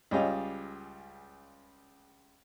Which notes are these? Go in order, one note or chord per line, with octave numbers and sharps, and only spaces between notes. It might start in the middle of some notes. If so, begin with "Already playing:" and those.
C#2 G3 C#4 G#4 D#5 F5